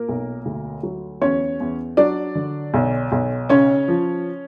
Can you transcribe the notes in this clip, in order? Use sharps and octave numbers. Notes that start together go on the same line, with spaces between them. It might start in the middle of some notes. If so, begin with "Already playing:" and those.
Already playing: A#2 A#3 A#4
B1
D2
F#3
E2 C#4 C#5
E2
F#3 D4 D5
D3
B1
B1
C#3 C#4 C#5
F3